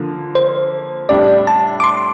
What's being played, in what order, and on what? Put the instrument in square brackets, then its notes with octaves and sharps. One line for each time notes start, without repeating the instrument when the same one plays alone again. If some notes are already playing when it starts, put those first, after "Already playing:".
Already playing: [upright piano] D3 F3 A#3
[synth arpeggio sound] C5
[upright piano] A2 G3 D4 G4 [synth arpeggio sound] D5
[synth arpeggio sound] A5
D6
C6